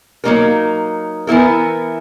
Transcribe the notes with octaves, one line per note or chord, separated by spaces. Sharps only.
F#3 A#3 D#4 A#4
E3 B3 E4 A#4